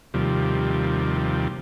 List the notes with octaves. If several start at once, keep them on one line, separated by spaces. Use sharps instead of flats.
D#2 C3 F3 G3